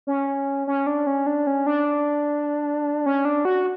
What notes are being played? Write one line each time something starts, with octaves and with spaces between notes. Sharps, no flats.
C#4
C#4
D4
C#4
D4
C#4
D4
C#4
D4
F#4